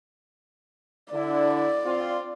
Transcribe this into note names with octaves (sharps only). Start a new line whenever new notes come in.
D3 E4 D5
C4 F4